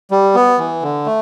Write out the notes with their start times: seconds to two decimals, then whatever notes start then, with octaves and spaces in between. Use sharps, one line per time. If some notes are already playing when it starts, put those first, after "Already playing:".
0.11 G3
0.35 B3
0.59 E3
0.82 D3
1.06 A3